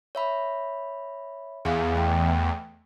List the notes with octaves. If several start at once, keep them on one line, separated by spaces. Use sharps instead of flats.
C#5 E5 B5
E2 G#4 F5
A3 G5